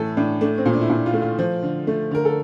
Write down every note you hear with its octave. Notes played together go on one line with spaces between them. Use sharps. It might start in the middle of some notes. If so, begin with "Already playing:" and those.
Already playing: A2 E3 A3 A4
A2 D4
A3 D4
C4
A#2
D4
E4
A#2 D4
F4
A3
F4
F3
D3
A3
D3 A#4
A4